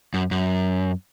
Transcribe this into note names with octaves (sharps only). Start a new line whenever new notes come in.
F#2
F#2